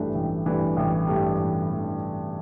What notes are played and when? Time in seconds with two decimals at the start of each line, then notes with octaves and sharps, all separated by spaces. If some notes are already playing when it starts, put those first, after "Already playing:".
Already playing: A1 G2 E3 A3 D4
0.15 A1
0.46 G2 E3 A3 D4
0.77 A1
1.08 G2 E3 A3 D4
1.38 A1
1.70 E3 A3 D4